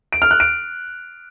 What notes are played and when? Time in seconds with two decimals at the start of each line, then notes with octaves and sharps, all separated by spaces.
0.13 D7
0.22 F6
0.31 F#6
0.40 D7